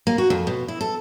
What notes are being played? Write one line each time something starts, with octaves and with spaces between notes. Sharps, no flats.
A#3
F#4
F2
B2
E4
A4